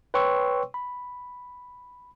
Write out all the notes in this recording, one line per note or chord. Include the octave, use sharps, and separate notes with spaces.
B4 C#5 G5 C6 C#6 E6
B5